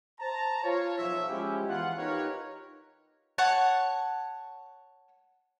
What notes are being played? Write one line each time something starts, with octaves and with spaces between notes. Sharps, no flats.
C5 A5 A#5
F4 C#5
B1 F3 F#3 E5
F3 G#3 C#4 E4 G4
E2 F4 F#5
D#4 F4 G4 A#4 B4 C#5
C#5 F#5 A5